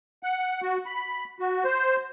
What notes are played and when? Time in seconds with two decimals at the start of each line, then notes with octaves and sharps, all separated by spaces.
0.23 F#5
0.62 F#4
0.86 B5
1.40 F#4
1.65 C5